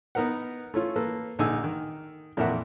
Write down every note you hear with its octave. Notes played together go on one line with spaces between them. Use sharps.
B3 D#4 A#4 B4 F#5
A3 C#4 F4
A#3 A4 B4
A#1 D3 D#4 G#5 E6
D#3
F2 A#2 E3 A#4 E5 F#5